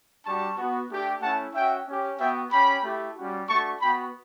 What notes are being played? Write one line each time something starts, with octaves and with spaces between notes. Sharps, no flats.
G3 D4 F#4 A5 C#6
B3 F#4
A3 D4 G4
A3 C#4 E4 F#5 A5
C#4 F#4 E5 G5
C#4 G4
B3 F#4 E5 G5
C#4 G4 G5 B5
A3 E4 G4
G3 C#4 F#4
A3 D4 F#4 A5 C#6
B3 F#4 G5 B5